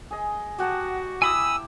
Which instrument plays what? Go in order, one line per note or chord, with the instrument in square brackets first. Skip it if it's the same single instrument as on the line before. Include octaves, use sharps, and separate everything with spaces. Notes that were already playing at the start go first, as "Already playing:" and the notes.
[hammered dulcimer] G#4 D#5
[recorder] F#4 [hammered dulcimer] G4 F#5 A5
[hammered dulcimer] E4 G4 [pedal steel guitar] G#5 B5 D#6 [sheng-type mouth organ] E6